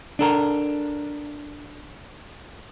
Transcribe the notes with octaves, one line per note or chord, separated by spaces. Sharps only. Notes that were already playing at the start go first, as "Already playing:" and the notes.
D4 A4 A#4